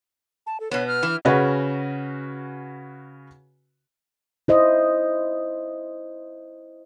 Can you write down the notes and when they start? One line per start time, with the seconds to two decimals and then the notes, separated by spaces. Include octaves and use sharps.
0.47 A5
0.60 A4
0.71 B2 B3 C#5
0.88 F6
1.03 E3
1.25 C#3 C#4 F#4 B4
4.48 E4 C5 D#5